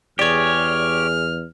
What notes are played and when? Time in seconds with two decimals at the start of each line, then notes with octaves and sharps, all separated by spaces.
0.19 E2 G4 G#4 C#5 D5 F6